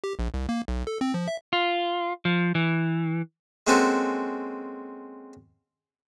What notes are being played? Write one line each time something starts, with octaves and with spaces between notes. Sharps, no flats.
G4
A#1
C2
A#3
B1
A4
C4
F3
E5
F4
F3
E3
G#3 A#3 C4 C#4 F#4 A4